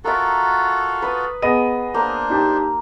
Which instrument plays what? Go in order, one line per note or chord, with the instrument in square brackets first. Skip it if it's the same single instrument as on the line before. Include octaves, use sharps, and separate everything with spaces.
[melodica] F4 F#4 A4 [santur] A#4 E5
[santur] B4 D#6
[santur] B3 [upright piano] G#4 D#5 D#7
[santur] A#3 [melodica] D4 C5
[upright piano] D#4 G4 A5